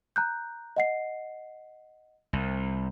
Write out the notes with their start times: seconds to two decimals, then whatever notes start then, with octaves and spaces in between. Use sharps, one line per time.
0.16 A#5 F#6 G6
0.77 D#5 F#5 C7
2.33 C2